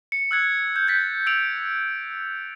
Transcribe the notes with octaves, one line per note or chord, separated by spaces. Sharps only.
C#7
E6 F#6 G#6 C#7
G6
G6 A6 B6
E6 D7 F7